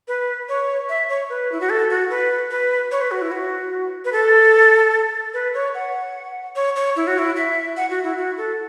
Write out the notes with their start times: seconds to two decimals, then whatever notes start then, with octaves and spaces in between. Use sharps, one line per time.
0.08 B4
0.49 C#5
0.89 E5
1.09 C#5
1.29 B4
1.52 E4
1.61 F#4
1.70 A4
1.90 F#4
2.10 B4
2.51 B4
2.91 C#5
3.01 B4
3.11 F#4
3.22 E4
3.32 F#4
4.05 B4
4.12 A4
5.34 B4
5.54 C#5
5.75 F#5
6.56 C#5
6.76 C#5
6.96 E4
7.07 F#4
7.19 E4
7.36 E5
7.77 F#5
7.90 F#4
8.04 E4
8.17 F#4
8.38 A4